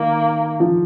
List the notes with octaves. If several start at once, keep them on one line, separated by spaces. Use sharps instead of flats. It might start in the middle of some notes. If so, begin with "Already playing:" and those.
Already playing: D#3 A#3
F3